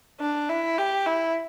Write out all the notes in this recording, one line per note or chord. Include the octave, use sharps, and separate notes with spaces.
D4
E4
G4
E4